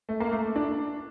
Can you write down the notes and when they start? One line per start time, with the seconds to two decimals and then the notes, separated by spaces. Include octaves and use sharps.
0.09 A3
0.20 A#3
0.32 A3
0.56 D4